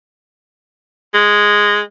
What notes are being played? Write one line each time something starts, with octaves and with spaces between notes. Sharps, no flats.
G#3